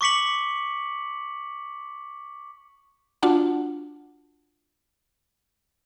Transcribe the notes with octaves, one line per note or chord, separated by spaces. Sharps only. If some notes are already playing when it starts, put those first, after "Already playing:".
C#6 D6 B6 C#7 F#7
D4 F4 F#4 F#5 A5